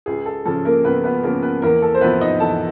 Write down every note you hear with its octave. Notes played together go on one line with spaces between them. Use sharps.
C#2 G#4
A4
C#3 F3 A4
A#3 A#4
C#2 B3 B4
B3 B4
C#3 F3 A#3 A#4
B3 B4
E2 A#3 A#4
A4
C5
C3 F3 B3 B4
D#4 D#5
E2 A4 A5